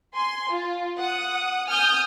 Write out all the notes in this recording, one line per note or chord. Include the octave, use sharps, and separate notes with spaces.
G#5 C6
F4
F#5 D#6
G#5 D#6 F6 G6